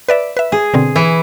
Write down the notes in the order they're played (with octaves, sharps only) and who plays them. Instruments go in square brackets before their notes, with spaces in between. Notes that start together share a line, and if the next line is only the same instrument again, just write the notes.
[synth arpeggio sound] B4 D5 E5
B4 E5
[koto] G#4
[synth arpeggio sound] B2 D3 C4
[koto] E3 E4